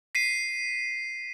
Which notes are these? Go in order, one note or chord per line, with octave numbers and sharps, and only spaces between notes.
B6 C7 D#7